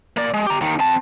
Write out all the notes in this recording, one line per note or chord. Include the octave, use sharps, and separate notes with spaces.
A#3 D5
G#3
G4 A#5
D#2 D#3
C4 A5